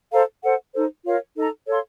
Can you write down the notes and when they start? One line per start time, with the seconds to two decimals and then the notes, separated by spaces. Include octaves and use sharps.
0.12 A4 C5 F5 A#5
0.42 A4 C5 F#5
0.73 D#4 A4 C5
1.04 F4 A#4 C#5 F5
1.35 D#4 A4 D#5 A#5
1.66 A4 C#5 F5 C6